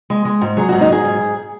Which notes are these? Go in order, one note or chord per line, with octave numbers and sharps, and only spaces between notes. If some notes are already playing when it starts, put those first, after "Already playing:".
G#3
G#3
G#2
F#3 G#4
F#4
G#2
D#4
G#2 G#4
G#2
G#2